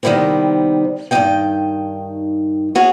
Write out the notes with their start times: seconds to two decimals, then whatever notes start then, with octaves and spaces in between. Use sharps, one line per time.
0.03 C3 D#3 F3 G3 B3 C4
1.11 G2 D#3 A#3 C#4 D#4 G5
2.75 C#4 F#4 G#4